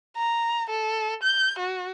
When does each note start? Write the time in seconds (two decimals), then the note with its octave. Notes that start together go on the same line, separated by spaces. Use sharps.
0.17 A#5
0.70 A4
1.23 G6
1.58 F#4